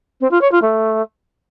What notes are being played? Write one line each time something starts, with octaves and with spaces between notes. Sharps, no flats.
C4
F4
C#5
F4
A3